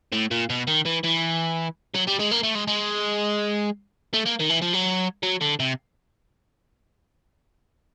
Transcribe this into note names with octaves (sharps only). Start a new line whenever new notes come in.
A2
A#2
B2
D#3
E3
E3
F#3
G3
G#3
A#3
A3
G#3
G#3
A3
A#3
D#3
E3
F3
F#3
F#3
D3
C3